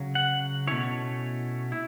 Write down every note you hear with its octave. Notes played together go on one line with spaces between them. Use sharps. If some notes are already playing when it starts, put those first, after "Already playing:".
Already playing: C#3 F#3 C#4
F#5
B2 A3 C#4 E4 C#5
E4